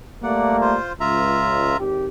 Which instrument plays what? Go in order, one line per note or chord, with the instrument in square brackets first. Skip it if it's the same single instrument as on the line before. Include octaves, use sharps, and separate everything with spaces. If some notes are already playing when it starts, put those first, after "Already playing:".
[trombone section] G3 A3 A#3 [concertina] D5 F#5
[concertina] F4 C5
[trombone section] C#2 [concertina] F4 E5 A#5
[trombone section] G#1 G4